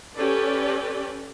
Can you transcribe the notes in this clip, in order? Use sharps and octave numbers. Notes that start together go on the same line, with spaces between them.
C#4 G4 A4 B4 D5